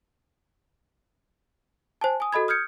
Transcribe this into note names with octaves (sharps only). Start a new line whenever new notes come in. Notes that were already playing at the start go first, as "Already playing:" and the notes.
C5 G#5 A5
G#5 D#6
F#4 A4 D#5 B5 G#6
D#6 F6 G6 G#6 C#7